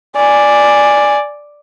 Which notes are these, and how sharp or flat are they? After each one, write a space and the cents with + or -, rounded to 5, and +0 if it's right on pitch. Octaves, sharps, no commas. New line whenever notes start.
D5 +0 G#5 +0